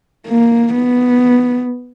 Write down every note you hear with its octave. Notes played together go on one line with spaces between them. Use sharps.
A#3
B3